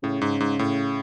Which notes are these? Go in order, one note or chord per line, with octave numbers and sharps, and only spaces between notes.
A2 C#3
G#2
G#2
A2